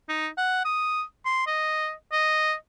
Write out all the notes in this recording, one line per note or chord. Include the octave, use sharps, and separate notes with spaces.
D#4
F#5
D#6
C6
D#5
D#5